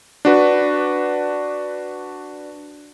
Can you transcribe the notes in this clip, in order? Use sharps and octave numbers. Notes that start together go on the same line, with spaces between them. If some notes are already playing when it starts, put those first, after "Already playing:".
D4 F#4 B4